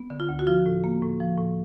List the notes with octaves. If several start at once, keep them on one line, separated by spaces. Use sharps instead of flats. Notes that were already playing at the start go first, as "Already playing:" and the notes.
Already playing: B3
D3
F4
D2
F#4
F3 F4
A2
A#3
A2
F3
A2